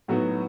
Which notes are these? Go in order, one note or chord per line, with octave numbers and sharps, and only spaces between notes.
A2 F#3 B3 D#4 F#4